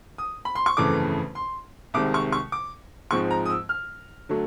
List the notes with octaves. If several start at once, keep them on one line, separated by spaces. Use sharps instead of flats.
D#6
B5
C6
C#6
G1 F2 C#3 E3 A3 D6
C6
C2 C3 D#3 G#3 D6
C#6
C#6
D6
G#2 F3 G#3 C4 C#6
A#5
D#6
E6
F6
D3 F#3 A3